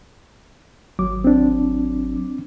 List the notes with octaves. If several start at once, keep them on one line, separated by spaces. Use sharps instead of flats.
G#1 F#3 D6
C4 D4